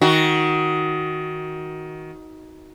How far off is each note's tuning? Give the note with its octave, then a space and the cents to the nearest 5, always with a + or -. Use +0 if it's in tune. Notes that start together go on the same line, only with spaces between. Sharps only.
D#3 +15 F#4 +0